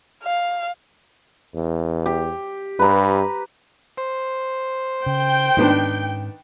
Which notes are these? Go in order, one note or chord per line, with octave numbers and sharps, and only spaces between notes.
F5
E2
G4
G2 B4 A#5
C5
C#3 G5
G#2 D#3 B3 C#4 D4